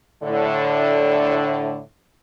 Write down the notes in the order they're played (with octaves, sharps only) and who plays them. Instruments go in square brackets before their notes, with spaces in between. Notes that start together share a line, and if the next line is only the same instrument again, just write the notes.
[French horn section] A2 D3